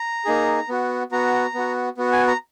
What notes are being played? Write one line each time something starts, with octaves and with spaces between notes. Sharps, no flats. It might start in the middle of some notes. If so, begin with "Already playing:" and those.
Already playing: A#5
A#3 D#4 G#4
B3 F#4
B3 F#4 A#5
B3 F#4
B3 F#4
G#5
A#5